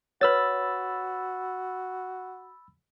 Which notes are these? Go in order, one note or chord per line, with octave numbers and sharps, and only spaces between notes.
F#4 B4 C#5 B5 E6 A6